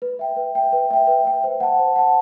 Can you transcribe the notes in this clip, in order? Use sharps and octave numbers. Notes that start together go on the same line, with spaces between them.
B4
E5 G5
B4
E5 G5
B4
E5 G5
B4
E5 G5
C5
F#5 A5
C5
F#5 A5